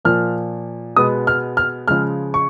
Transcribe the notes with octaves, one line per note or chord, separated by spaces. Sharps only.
A#2 F3 A#3 F6
B2 G#3 B3 D#6
F6
F6
C#3 F3 G#3 F6
C#6